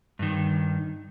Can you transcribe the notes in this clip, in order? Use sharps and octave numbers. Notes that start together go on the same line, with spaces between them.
G2 D#3